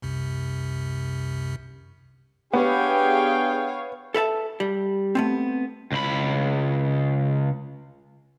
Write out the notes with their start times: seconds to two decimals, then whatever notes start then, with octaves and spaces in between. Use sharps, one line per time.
0.02 C2 F#2 C3
2.53 B3 D4 G4 G#4 C#5 F5 G5
4.14 A4 B4 E5 A5
4.60 G3
5.15 A3 B3 C4
5.92 C#2 B5